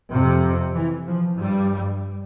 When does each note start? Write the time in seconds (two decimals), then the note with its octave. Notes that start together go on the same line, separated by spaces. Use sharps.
0.12 F2 C3
0.75 E3
1.07 F3
1.38 G2 G3